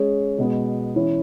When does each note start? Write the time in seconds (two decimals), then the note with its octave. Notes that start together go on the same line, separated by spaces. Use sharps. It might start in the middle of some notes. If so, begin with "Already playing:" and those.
Already playing: G#3 C#4 G#4
0.38 B2 G#3 B3
0.95 E3 C#4 E4